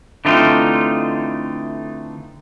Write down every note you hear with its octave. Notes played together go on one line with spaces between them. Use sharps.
D3 E3 A3 C4 D#4 F4